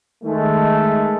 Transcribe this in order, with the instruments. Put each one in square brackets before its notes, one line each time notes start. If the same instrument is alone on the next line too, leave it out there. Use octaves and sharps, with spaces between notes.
[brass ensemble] D#3 G#3 A3